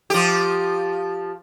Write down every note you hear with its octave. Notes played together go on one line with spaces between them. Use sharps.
F3 G4